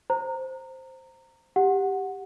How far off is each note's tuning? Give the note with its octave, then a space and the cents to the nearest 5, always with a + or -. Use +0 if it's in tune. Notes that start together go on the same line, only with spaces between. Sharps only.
C5 +0 A#5 -20
G4 +0 F#5 -5